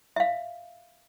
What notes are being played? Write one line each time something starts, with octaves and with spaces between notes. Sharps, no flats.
E5 F5